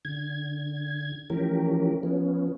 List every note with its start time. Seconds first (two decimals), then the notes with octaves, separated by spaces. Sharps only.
0.05 D3 G#6
1.30 E3 F3 A3 C#4 G4 A#4
2.03 F3 B3 C#4